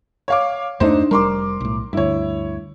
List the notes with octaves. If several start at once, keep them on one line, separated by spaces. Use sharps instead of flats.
C#5 F5 D6
E2 G2 A3 D4 D#4 C5
F1 G3 A#4 C6 D6
B1 A2
D2 G2 E4 C#5